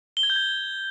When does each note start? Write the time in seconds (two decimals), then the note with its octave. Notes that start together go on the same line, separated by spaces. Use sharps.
0.17 G7
0.23 G#6
0.30 G6
0.36 G#6